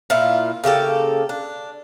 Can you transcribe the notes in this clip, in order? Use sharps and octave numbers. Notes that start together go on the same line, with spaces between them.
A#2 E4 F4
C#3 A#3 G4 A4
D4